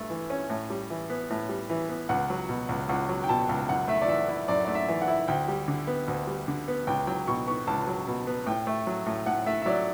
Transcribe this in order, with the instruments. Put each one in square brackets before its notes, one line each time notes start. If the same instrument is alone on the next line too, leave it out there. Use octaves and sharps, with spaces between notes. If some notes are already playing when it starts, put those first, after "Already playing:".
Already playing: [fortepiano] G2 A3
E3
C#4
A2
G3
E3
B3
A2
G3
E3
B3
[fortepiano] C#2 [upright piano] F#5
[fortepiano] F#3
B2
C#2
[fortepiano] C#2 [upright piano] F#5
[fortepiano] F#3
[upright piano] G5
[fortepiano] B2 [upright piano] A5
[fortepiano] C#2
[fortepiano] F#2 [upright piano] F#5
[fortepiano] A3 [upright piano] E5
[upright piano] D5
[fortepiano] E3 [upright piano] E5
[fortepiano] E4
[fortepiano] F#2 [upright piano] D5
[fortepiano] A3 [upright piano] D5
[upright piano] E5
[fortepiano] E3
[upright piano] F#5
[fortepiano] E4
[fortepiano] D2 [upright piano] G5
[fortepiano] G3
D3
B3
D2
G3
D3
B3
[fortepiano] C#2 [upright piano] G5
[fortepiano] F#3 [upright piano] G5
[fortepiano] B2 [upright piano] C#6
[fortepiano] B3 [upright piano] C#6
[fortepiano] C#2 [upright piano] A5
[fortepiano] F#3
B2
B3
[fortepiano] A2 [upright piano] G5
[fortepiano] A3
F#3
A2
[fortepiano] A2 [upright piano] F#5
[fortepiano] A3 [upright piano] E5
[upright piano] E5
[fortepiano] F#3 [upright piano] D5